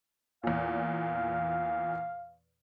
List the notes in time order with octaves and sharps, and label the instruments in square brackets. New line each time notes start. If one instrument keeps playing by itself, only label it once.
[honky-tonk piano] E2 A#2 [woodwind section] F5